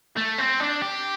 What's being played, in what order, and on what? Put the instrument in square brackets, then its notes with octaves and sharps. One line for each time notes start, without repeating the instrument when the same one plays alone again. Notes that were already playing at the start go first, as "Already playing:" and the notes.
[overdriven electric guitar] A3
C4
D4
G4